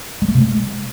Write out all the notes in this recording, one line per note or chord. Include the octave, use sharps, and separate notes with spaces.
G#3
A3
C3
G#3